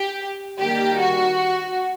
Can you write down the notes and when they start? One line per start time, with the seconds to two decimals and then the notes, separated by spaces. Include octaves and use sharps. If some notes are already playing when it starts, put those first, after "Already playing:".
Already playing: G4
0.60 D#3 G3 A#3 G4
0.99 F#4